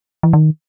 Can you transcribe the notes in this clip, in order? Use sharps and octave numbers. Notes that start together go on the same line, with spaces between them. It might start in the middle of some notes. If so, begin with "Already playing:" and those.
E3
D#3